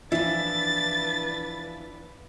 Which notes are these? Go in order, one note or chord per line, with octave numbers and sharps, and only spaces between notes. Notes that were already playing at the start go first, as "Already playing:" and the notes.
E3 F3 D4 E4 B4 A6